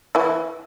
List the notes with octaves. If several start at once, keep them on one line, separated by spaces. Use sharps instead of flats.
E3 E4